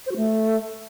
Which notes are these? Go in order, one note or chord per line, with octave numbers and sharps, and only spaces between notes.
C5
F#4
A3